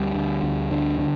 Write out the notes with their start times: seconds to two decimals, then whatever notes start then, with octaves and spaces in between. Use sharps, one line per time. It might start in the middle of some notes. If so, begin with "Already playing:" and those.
Already playing: D2 G3
0.14 D3
0.43 D2
0.71 D3
0.99 D3